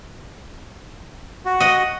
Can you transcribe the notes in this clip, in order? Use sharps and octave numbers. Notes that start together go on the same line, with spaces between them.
F#4
D#5 F#5